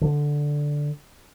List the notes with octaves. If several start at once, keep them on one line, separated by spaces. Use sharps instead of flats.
D3